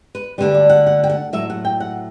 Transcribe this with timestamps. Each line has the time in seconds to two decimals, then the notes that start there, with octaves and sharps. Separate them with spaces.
0.15 B4
0.38 D2 D3 G3 B4
0.54 D5
0.70 F#5
0.86 F#5
1.04 G5
1.10 F#5
1.33 A2 F#3 E5
1.50 F#5
1.65 G5
1.80 F#5